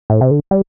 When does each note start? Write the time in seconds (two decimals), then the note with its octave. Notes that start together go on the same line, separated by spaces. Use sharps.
0.10 A2
0.21 C3
0.31 D3
0.51 G3